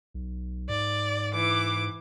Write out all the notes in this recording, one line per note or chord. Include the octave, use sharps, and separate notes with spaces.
B1
G#2 D5
E3 D6